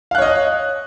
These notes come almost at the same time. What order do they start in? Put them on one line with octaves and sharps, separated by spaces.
F5 F#6 C#5 D#5